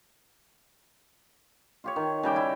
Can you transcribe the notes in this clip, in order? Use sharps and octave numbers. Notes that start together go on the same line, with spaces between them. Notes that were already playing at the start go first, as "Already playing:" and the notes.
F4 G4 C#5
D#3
C#3 G3 G5 D6
E4